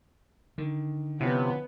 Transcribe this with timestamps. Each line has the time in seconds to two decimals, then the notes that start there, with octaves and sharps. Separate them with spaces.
0.58 D3 D#3
1.21 C3 F3 B3 C#4 E4